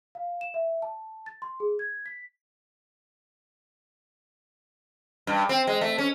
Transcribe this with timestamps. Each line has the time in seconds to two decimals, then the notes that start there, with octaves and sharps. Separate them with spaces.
0.15 F5
0.41 E7
0.54 E5
0.82 A5
1.26 A6
1.42 C6
1.60 G#4
1.79 G#6
2.06 B6
5.27 G2
5.49 C4
5.67 G#3
5.81 A3
5.98 C#4